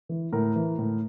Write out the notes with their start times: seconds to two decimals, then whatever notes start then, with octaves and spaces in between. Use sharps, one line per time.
0.09 E3
0.33 A2 A#4
0.56 E3
0.79 A2